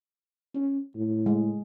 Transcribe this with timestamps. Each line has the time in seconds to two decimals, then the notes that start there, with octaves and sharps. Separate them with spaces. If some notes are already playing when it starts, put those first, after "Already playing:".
0.55 C#4
0.96 A2
1.26 G#3